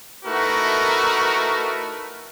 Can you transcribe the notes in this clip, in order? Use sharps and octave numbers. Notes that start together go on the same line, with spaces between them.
A3 D#4 E4 F#4 A#4 B4